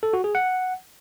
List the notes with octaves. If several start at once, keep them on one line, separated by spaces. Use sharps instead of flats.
A4
F#4
G#4
F#5